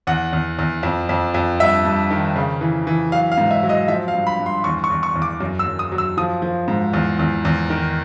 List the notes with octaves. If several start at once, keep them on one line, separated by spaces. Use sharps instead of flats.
E2 F#5
E2
E2
F2
F2
F2
G2 E5
G2
D#3
C#3
E3
E3
F#3 F5
F5
G#2
E5
F#3
D#5
F3 E5
F5
G2
B5
G2
C6
E2 C#6
C#6
E2
C#6
E2
D6
F#2
E6
F#2
D#6
F#3
E6
F3 D#6
F3
G#2
E2
E2
E2
D#3